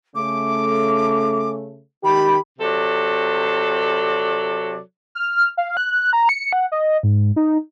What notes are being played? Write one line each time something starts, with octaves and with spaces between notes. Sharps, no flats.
C#3 A3 D6
D#3 G4 B5
C3 F#3 A4 D5
F6
F5
F#6
A#5
C#7
F#5
D#5
G#2
D#4